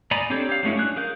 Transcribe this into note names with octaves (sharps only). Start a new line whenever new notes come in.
D5 D#5 G#5 A#5 B5
C4 D4 G4 A4 C#5
G4 F5
F#3 G#3 A3 C#4 E4
D4 G#4 F#6
G#4 A#4 F5 G6